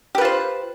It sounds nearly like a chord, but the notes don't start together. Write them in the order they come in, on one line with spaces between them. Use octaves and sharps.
G4 B4 F4 C5